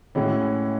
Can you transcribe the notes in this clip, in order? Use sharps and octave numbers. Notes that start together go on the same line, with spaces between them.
A2 E3 G#3 C#4 F#4